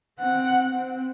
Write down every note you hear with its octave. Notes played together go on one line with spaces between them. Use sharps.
C4 F#5
C4